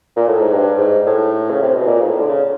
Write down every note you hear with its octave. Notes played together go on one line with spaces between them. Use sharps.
A#2
A2
G#2
G2
G#2
A2
C#3
C3
B2
A#2
G#2
A2
D3
C#3